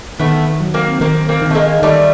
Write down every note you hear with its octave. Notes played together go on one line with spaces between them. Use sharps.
D#3 A3 B3
F#3
A#3 C4
D#3 A#3 C4
A#3 C4
D#3
A3
G#3 A#3
D#3 G3 A3